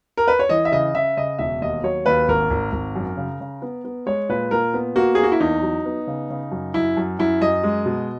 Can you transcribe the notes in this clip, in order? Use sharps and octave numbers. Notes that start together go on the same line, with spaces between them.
A#4
B4
C#5
E3 D#5
E5
C#3 D#5
C#3 E5
C#3 D#5
E1 E5
D#2 D#5
F#3 C#5
D#2 B4
G#1 A#4
G#1
G#1
F#2
C#3
C#3
B3
B3
G#3 C#5
A#2 B4
A#2 A#4
B3
A#3 F#4
A#3 G#4
F#4
E4
E2 D#4
F#3
B3
C#3
C#3
F#2
F#2 E4
F#2
F#2 E4
F#2 D#5
G#3
B2